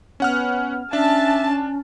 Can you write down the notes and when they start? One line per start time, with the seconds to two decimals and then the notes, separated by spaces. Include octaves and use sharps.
0.20 B3 C#4 F#5 F6
0.93 C#4 D4 E5 A5